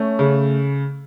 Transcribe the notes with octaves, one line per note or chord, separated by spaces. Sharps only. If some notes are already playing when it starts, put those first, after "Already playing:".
Already playing: A3 C#4
C#3